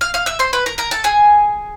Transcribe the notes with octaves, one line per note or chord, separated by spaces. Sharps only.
F5 F6
F5 F6
E5 E6
C5 C6
B4 B5
A#4 A#5
A#4 A#5
A4 A5
G#4 G#5